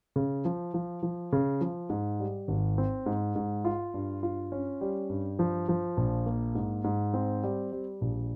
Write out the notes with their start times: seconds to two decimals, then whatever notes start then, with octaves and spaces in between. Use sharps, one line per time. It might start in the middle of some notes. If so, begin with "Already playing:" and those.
0.16 C#3
0.45 F3
0.74 F3
1.03 F3
1.33 C#3
1.61 F3
1.90 G#2
2.20 G3
2.48 G#1
2.78 C4
3.06 G#2
3.36 G#2
3.65 F4
3.94 G2
4.23 F4
4.52 C#4
4.81 G3
5.10 G2
5.39 F3
5.69 F3
5.97 A#1
6.26 A#3
6.55 G#2
6.84 G#2
7.14 C4
7.43 G3
7.72 G3
8.01 A#1